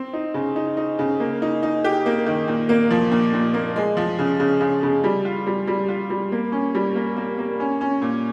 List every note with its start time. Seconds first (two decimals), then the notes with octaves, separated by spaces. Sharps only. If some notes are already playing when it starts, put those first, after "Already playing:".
Already playing: C4
0.13 D#4
0.34 C#3
0.56 D#4
0.77 D#4
0.99 C#3
1.20 A#3
1.42 D#4
1.63 D#4
1.84 G4
2.06 A#3
2.26 D#3
2.48 A#2
2.69 A#3
2.91 F3
3.12 A#2
3.33 A#2
3.54 A#3
3.76 G#3
3.97 F3
4.19 C#3
4.40 C#3
4.61 C#3
4.83 C#3
5.04 G3
5.25 F4
5.47 G3
5.67 G3
5.89 F4
6.10 G3
6.32 A#3
6.52 C#4
6.75 G3
6.95 A#3
7.17 A#3
7.38 A#3
7.60 C#4
7.81 C#4
8.02 A#2